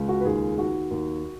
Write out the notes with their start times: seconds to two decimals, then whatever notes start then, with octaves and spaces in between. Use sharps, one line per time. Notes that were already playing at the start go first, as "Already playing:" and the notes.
Already playing: C#2
0.09 F#4
0.21 B4
0.25 D#2 G#4
0.58 D#2 F#4
0.91 D#2